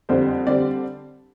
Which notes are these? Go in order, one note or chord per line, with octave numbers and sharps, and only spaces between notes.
F2 D3 G3 C4 C5
D3 G3 C4 D5